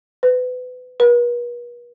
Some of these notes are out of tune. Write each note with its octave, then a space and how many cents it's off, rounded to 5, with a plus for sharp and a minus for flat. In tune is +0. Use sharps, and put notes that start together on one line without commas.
B4 +30
B4 -45